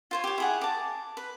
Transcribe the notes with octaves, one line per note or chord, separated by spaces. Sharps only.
F4 C5 C#5
G4 C#5
E4 G#4 F#5
A5 D6
B4